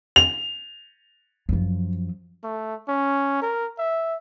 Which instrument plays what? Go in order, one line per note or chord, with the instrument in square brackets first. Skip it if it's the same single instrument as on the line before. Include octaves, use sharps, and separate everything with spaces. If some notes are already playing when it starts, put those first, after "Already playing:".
[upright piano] F7
[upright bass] F#2 F3
[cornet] A3
C#4
A#4
E5